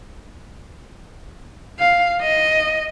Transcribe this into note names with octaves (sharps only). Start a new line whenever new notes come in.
F5
D#5